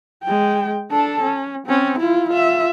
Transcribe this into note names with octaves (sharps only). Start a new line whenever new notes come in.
G#3 G5
D4 A4
C#4
C4 C#4
E4 F4
F4 E5